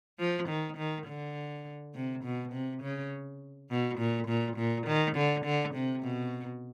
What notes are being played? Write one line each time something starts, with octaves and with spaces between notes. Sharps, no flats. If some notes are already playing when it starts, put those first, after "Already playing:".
F3
D#3
D#3
D3
C3
B2
C3
C#3
B2
A#2
A#2
A#2
D#3
D3
D3
C3
B2